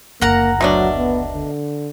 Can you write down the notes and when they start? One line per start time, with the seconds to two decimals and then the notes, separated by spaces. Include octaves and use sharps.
0.21 F#1 D2 A#3 A#4 F#5 A#5
0.61 B2 F#3 A3 D4
0.97 B3
1.33 D3